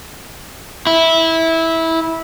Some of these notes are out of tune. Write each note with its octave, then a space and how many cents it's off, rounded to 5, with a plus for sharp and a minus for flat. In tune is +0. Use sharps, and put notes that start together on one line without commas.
E4 -15